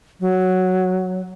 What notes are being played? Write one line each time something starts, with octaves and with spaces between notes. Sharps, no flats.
F#3